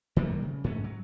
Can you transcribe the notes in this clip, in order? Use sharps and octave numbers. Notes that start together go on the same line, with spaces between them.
D#3 G3 A3 A#3
C#3
G#2 A3 B3 C#4
F#3